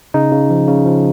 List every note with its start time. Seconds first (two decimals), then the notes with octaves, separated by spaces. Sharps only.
0.14 C#3 D#4
0.32 C#3
0.50 F3
0.68 C#3
0.86 F3